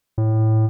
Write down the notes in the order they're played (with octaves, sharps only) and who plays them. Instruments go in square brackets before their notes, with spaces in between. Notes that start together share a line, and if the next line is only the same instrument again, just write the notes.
[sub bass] A2